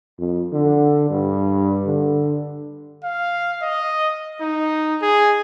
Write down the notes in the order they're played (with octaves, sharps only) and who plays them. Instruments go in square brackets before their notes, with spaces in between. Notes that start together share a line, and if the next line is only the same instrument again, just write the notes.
[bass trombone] F2
D3
G2
D3
[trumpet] F5
D#5
D#4
G#4